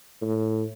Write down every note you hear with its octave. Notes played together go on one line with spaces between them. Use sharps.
A2